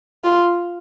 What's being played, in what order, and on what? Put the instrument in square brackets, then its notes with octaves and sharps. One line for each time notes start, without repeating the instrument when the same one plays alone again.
[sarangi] F4